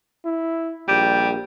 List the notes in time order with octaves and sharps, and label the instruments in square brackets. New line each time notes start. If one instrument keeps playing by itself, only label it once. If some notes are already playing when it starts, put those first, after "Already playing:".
[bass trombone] E4
[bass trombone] A#1 [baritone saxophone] G3